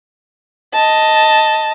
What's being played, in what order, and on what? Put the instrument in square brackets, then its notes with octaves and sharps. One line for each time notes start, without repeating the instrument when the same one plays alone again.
[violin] D#5 A5